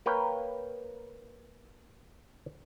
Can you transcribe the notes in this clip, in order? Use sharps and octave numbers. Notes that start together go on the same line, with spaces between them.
A#3 A#4 B4 C#5 G5